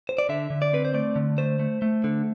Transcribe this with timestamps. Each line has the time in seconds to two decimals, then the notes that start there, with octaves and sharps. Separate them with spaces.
0.09 C5
0.18 D5
0.29 D3 E5
0.50 D3
0.62 D5
0.73 C4 B4
0.85 C5
0.94 A3 D5
1.16 D3
1.38 A3 C5
1.59 A3
1.82 A3
2.04 D3